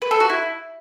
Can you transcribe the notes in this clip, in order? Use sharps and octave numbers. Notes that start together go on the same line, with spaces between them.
B4
A4
F#4
E4